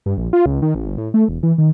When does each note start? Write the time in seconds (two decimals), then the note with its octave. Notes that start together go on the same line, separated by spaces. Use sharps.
0.06 G2
0.18 A#1
0.33 F4
0.46 C#2
0.62 D#3
0.75 A1
0.86 G1
0.98 A2
1.14 A3
1.29 E1
1.43 E3
1.58 D#3